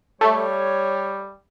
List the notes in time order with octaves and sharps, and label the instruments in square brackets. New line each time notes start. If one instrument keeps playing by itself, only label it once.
[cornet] G3 [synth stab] A3 [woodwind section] C#5